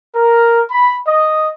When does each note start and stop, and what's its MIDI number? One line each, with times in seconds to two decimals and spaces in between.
0.15 0.61 70
0.69 0.94 83
1.06 1.48 75